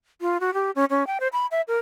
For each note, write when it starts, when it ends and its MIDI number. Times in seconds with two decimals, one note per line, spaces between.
0.21 0.37 65
0.40 0.53 66
0.54 0.71 67
0.75 0.85 61
0.90 1.06 61
1.07 1.18 79
1.20 1.28 72
1.33 1.46 83
1.51 1.61 76
1.68 1.78 70